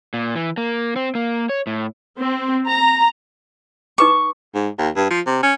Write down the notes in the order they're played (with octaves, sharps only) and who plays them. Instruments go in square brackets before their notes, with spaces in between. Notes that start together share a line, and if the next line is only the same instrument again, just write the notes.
[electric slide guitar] A#2
E3
A#3
C4
A#3
C#5
A2
[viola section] C4
A#5
[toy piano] D#4 B4 D6 [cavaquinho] C#6
[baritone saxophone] G#2
D#2
G2
F3
C3
C#4